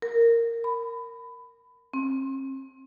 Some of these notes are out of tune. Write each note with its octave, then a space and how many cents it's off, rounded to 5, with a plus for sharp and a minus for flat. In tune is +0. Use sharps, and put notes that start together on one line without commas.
A#4 -10
B5 +20
C4 +40